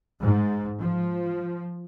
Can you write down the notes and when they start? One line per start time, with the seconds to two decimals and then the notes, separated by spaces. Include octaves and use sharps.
0.21 G#2
0.81 F3